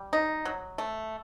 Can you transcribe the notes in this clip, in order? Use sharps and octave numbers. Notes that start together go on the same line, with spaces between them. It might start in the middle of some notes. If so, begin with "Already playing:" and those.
Already playing: G3
D#4
F#3
A3